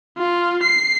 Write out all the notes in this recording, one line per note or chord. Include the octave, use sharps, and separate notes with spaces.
F4
C7